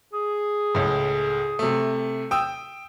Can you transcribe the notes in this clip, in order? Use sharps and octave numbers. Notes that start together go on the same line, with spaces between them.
G#4
C#2 A2
C3 A3
G5 D#6 E6